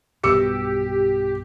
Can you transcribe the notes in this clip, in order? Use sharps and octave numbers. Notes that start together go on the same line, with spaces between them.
B1 G2 B2 G4 D6 E6 C#7